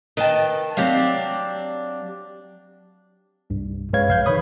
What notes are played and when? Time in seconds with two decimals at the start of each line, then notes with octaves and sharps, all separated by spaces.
0.17 D#3 B4 D#5 G5 A5
0.77 F#3 C4 D4 G4 F5
3.50 C2 G2
3.93 F#2 G#3 B4 C#5 F5 G#6
4.08 A#1 F5 G6
4.26 D#3 E3 B4 C#5 B5 D#6